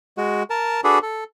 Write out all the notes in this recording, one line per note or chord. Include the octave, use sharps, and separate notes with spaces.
G#3 F#4
A#4 A5
D4 F#4 G#4 A4 B4
A4